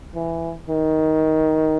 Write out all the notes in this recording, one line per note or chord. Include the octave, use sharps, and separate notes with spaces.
E3
D#3